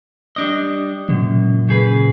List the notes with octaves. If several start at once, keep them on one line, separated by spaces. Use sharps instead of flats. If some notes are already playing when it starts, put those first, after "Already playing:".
G3 D4 D#5
C#2 F#2 A#2
C#3 G#4 B4